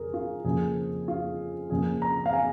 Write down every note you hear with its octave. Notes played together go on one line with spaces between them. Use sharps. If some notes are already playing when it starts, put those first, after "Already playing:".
Already playing: F2 C#3 G#4 A#4
F4
F2 C#3 F3 A#3 G#4
F4
F2 C#3 A#3 G#4
A#5
F5
G#5